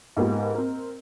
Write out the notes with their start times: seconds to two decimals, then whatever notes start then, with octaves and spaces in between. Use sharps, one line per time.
0.17 G#2 A#3 B3 F4 G4
0.55 C4 A#4